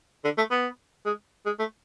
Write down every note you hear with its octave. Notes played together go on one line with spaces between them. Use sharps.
D3
A3
B3
G#3
G#3
A3